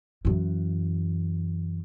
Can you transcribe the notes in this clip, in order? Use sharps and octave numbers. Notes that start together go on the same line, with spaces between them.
F#2 E3